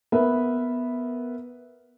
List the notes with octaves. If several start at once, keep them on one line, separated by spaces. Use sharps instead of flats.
B3 A#4 B4 E5